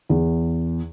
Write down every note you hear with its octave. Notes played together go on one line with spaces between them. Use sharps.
E2